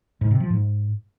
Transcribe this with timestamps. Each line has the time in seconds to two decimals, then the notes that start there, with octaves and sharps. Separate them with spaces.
0.21 G#2
0.31 C3
0.40 F3
0.50 G#2